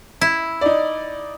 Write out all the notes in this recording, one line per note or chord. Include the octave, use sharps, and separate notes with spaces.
E4
D#4 D5